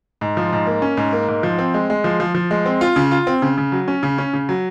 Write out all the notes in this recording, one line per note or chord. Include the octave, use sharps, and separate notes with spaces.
G#2
F3
G#2
A#3
C#4
G#2
A#3
G#2
F3
C4
G#3
G#3
F3
F3
F3
G#3
C4
F4
C#3
F4
C4
C#3
C#3
F#3
C#4
C#3
C#4
C#3
F#3